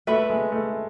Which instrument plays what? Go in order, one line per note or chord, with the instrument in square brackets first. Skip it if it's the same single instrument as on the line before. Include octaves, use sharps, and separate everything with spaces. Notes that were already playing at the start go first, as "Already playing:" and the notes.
[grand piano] A3 [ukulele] B4 E5 B5
[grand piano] G#3
A3